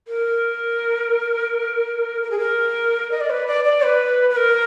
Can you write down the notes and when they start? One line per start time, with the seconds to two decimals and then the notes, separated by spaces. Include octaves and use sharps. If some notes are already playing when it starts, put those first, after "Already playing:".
0.08 A#4
2.23 A#4
2.31 G#4
2.39 A#4
3.11 D#5
3.21 D5
3.30 B4
3.47 D5
3.65 D5
3.83 B4
4.30 B4
4.36 A#4